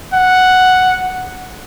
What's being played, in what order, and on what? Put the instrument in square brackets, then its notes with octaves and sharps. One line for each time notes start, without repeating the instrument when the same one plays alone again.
[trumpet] F#5